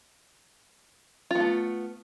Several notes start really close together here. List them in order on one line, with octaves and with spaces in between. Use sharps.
F4 B3 A3